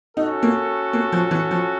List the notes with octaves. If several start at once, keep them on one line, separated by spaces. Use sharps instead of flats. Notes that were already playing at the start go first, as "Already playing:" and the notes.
C#4 D#4 F#4 A4
A#3
A#3
F3
E3
F3